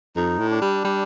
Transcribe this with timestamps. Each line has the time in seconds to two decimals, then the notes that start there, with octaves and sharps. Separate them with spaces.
0.16 F2 D#4
0.39 A2
0.51 D4
0.62 G3
0.85 G3